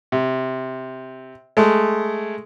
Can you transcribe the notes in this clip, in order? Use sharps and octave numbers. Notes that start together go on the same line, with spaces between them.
C3
G#3 A3